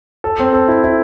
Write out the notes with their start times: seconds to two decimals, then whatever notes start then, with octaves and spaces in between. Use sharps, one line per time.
0.24 A4
0.39 C4
0.53 A4
0.68 E4
0.84 E4